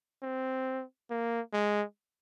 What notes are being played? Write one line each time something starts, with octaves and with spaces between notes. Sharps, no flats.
C4
A#3
G#3